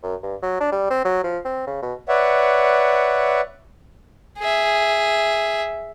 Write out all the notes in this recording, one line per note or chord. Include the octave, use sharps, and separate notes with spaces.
F#2
G2
F#3
D4
G3
C4
F#3
F3
C4
C#3
B2
B4 C#5 D5 E5 F#5
G#4 E5